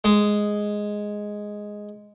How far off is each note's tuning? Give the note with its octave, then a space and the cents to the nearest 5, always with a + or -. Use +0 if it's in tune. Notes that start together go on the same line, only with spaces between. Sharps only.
G#3 +0